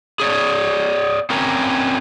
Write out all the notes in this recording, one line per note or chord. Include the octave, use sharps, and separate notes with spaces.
G#4 C#5 D5
C4 C#4 A#4